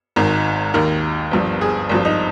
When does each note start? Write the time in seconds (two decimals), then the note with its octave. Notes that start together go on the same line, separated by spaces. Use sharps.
0.16 G#1 G#2 D#3
0.74 D#2 D#3 A#4
1.31 G1 G2 F3
1.61 G#4
1.89 G#1 G2 F3
2.05 D#4